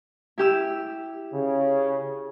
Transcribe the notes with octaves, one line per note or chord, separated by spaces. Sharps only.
E4 G4 E6
C#3